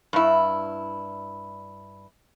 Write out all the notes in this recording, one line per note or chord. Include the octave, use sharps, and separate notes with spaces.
G2 E4